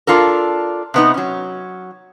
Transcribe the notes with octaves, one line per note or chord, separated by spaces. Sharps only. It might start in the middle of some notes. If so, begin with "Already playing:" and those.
D4 F4 A4 A#4
C3 B3 D#4
F#3 C#4